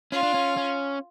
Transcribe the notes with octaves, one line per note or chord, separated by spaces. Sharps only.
C#4 F4
D4
C#4
C#4